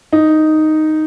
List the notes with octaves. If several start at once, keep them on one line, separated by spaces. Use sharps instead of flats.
D#4